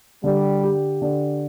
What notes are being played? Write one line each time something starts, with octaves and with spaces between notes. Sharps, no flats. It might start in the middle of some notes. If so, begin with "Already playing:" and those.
D3 G3
G4
D3